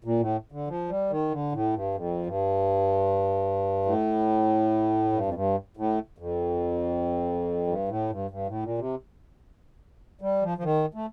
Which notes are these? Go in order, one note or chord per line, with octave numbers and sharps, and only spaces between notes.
A#2
A2
D3
F3
G3
D#3
D3
A2
G2
F2
G2
A2
G2
F2
G2
A2
F2
G2
A2
G2
G2
A2
A#2
C3
G3
F3
F3
D#3
A3